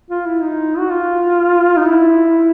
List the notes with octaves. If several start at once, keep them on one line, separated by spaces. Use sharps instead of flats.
F4
E4
D#4
F#4
F4
D#4
E4